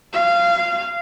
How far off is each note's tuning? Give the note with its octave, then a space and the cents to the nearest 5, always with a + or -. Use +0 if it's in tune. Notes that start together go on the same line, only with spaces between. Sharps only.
F5 -20